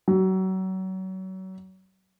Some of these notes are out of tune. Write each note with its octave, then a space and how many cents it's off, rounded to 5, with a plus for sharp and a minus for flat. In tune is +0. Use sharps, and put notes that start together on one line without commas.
F#3 +30